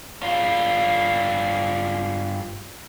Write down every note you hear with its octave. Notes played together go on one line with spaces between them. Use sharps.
G2 F4